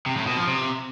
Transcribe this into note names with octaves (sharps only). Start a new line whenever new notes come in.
C3
A2
B2
F3
C3